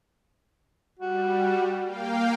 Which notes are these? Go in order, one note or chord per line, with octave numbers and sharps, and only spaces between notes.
G3 F#4
A#3 F5 G5